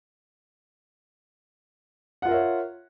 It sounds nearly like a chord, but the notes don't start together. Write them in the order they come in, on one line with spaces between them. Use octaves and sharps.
F#5 F4 A#4 E5 C#5